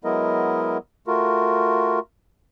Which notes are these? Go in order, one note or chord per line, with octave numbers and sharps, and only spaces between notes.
F#3 G#3 B3 E4 A#4 D#5
A3 F4 F#4 A#4